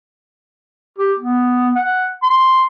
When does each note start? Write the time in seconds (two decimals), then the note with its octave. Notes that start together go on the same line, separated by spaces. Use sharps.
0.98 G4
1.19 B3
1.76 F#5
2.23 C6